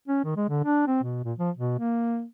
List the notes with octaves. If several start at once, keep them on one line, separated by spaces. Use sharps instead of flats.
C#4
D#3
G#3
D3
D4
C4
B2
A#2
F3
B2
A#3